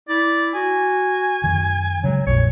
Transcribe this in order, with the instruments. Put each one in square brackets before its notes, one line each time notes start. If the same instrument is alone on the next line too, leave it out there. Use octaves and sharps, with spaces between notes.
[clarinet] E4 [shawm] D5
[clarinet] F#4 [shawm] G#5
[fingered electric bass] F#2 D#3
[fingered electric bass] C#3 G#3 [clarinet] F#3
[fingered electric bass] A#1 F2 A#2 [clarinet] C#5